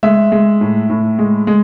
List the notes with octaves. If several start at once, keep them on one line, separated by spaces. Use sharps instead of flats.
G#3 E5
G#3
A2
A2
G#3
G#3